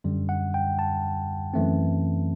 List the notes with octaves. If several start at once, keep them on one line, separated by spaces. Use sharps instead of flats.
F#2 D3 G3
F#5
G5
A5
F#2 E3 A3 C4